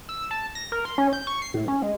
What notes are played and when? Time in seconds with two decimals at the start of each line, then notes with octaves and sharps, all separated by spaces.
0.09 E6
0.31 A5
0.55 A#6
0.72 A#4
0.85 C6
0.98 C#4
1.13 G6
1.27 C#6
1.42 C7
1.54 A2
1.68 C#4
1.82 G#3